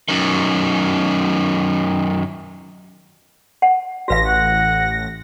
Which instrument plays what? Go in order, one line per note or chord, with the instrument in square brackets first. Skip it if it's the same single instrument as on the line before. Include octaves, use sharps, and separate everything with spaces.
[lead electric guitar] F#2 D#3
[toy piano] F#5
[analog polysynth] A1 A#6 [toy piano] F#4 B4 F5
[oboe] F#5